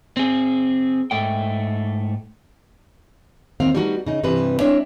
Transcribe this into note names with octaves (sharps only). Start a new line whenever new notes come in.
C4 G#4
G#2 A3 G5
D#2 D#3 C4 F5 A#5
G3 A3 B3 D#4 F#4
C#3 D#4
G2 C3 E3 G3 B4
G#3 C4 D4 E4 C#5 E5